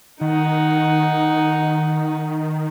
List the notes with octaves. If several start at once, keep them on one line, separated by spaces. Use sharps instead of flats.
D#3 D#4 F#5